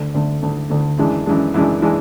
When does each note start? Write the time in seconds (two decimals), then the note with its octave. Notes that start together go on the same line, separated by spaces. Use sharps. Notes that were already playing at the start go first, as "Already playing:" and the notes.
Already playing: D2 D3 A3
0.14 D2 D3 A3
0.42 D2 D3 A3
0.70 D2 D3 A3
0.98 F#2 E3 G#3 D4
1.26 F#2 E3 G#3 D4
1.54 F#2 E3 G#3 D4
1.82 E3 G#3 D4